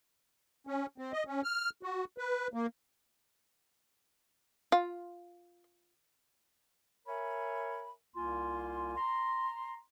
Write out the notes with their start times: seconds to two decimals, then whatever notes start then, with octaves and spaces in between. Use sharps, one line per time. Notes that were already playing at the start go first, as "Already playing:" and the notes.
0.67 C#4
0.98 C4
1.13 D#5
1.27 C#4
1.44 F6
1.83 F#4
2.18 B4
2.54 A#3
4.72 F4
7.08 A#4 C#5 E5 G#5 B5
8.15 C2 A#3 F4 G#5 C6
8.97 A#5 C6